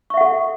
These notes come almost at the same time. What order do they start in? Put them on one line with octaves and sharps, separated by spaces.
C#6 E5 F#5 A4